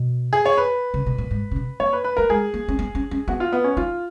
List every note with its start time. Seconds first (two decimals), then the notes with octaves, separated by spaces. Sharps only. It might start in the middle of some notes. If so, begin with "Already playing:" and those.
Already playing: B2
0.33 G#4
0.46 C#5
0.58 B4
0.94 C#3
1.06 B2
1.18 A#2
1.31 G#2
1.51 C#3
1.56 B2
1.80 A#3 C#5
1.93 B4
2.04 B4
2.17 A#3 A#4
2.29 G#3 G#4
2.54 A#3
2.68 C#4
2.79 B3
2.95 C#4
3.11 C#4
3.28 B3 F#4
3.40 F4
3.52 B3
3.64 C#4
3.77 D#4 F4